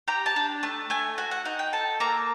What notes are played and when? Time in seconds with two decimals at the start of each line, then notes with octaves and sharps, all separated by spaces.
0.08 G4 A#5
0.26 A5
0.36 D4
0.63 A3 A5
0.90 A3 G#5
1.18 F#4 G#5
1.31 F#5
1.45 D#4 F#5
1.59 G5
1.73 A4 A5
2.00 A#3 A#5